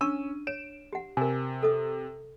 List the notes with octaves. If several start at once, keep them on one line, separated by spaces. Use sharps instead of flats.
C#4 D4 C#6 E6 D#7
C#5 D7 E7
G4 F#5
C3 A#4 G#5
A4 D#6